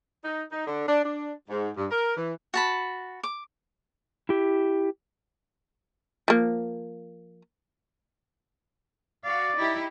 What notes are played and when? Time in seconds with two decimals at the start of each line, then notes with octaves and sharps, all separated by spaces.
0.24 D#4
0.51 D#4
0.67 D3
0.88 D4
1.04 D4
1.49 G#2
1.77 G2
1.91 A#4
2.16 E3
2.54 F#4 A5 B5
3.24 D6
4.29 E4 G4
6.28 F3 A#3
9.25 F#4 D5 F5
9.56 D#4 E4 G4